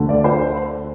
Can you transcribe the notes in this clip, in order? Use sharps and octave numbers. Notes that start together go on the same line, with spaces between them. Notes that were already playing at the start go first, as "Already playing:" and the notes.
Already playing: D2 D3 A3
D5
C5